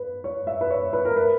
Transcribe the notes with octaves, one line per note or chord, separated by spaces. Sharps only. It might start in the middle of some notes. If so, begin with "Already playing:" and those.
Already playing: B4
C#5
E5
B4
C#5
B4
A#4
B4